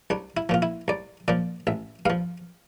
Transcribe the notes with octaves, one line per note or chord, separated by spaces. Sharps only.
C2 D4
E4
A#2 F3 F4
E4
C2 D5
A#2 F3 D5
A1 E5
G2 F3 F5